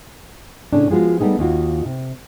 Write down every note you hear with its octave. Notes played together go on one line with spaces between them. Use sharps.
A2 C#3 C#4 D4
F3 G#3 B3 F4 F#4
G3 A3 B3 C#4 D#4 G#4
D#2 D#4 F4 F#4
C3